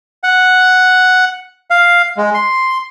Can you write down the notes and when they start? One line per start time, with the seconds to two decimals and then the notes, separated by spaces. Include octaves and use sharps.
0.24 F#5
1.71 F5
2.17 G#3
2.34 C6